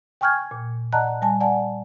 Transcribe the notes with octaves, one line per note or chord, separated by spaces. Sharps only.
G5 G#5 C#6 F6 G6 G#6
A#2
D5 D#5 F#5 A5 A#5 F#6
G3 G#5 A5
D5 F#5 G#5 A5